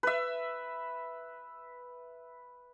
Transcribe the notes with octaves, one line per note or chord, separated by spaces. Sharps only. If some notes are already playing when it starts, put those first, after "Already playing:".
B4 E5